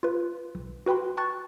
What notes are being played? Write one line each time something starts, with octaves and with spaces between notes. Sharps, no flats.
F4 B4
B1
F#4 B4 G5 B5 C6
G5 A5 C#6 F#6 A6